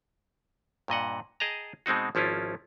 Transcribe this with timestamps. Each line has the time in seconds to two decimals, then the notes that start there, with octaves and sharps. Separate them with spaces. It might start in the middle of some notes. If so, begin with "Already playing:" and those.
0.88 G2 A#2 D#5 F#5
1.40 G#4 D#5 G5 A5 A#5
1.86 B2 G#3 C4 D#4 F#4
2.15 G#1 F3 C#4 E4 F4